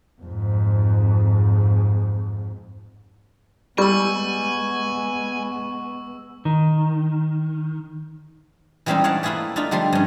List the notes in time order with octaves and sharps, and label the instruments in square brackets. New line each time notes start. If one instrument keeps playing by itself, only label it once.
[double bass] F2 G#2
[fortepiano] G3 [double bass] G#3 B3 [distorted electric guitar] G#5 [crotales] C#6 E6
[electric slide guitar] D#3
[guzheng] E3 G3 G#3 C4 C#4 D#4
C#5 D5 F5 F#5 A5
A3 A#3 E4 F4 G#4 B4
A3 D4 D#4 F4
D3 F3 G3 A3 C6
G2 C#4